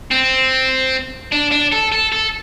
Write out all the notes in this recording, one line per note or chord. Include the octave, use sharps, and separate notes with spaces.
C4
D4
D4
A4
A4
A4